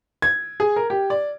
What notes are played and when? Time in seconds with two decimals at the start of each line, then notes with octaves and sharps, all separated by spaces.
0.22 G#6
0.60 G#4
0.76 A#4
0.90 G4
1.10 D5